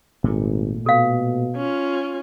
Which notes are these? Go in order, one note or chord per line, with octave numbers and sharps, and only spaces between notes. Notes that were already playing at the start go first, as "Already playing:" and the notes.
G#1 A#2 A3
B2 A4 F5
C#4 F4